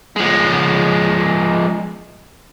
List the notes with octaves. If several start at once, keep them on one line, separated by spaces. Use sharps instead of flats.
F3 G#3